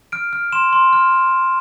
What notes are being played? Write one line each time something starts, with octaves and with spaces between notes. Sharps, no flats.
F6 D7
F6
C6 E7
C6
F6